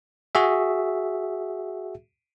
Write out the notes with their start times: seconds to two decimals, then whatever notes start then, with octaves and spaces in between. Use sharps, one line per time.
0.35 F#4 G#4 E5